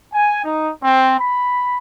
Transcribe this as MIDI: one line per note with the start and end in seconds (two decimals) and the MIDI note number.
0.12 0.40 80
0.44 0.69 63
0.82 1.19 60
1.19 1.78 83